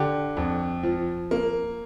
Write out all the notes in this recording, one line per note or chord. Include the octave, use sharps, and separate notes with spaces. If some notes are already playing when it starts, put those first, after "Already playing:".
Already playing: D3 G4
F2
F3
A#3